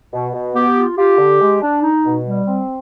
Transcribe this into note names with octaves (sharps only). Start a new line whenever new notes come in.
B2
B2
B3 G4
F4
F4 G4
D3
G#3
D4
D#4
B2
G3
C4